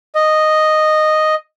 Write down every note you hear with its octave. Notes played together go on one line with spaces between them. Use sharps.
D#5